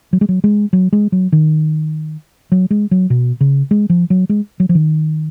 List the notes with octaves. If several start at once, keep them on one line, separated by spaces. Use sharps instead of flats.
F#3
G#3
F#3
G#3
F#3
G#3
F#3
D#3
F#3
G#3
F#3
B2
C#3
G#3
F3
F#3
G#3
F#3
F3
D#3